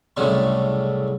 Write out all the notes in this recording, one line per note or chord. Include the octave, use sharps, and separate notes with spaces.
C2 A2 C#3 F#3 G3 A3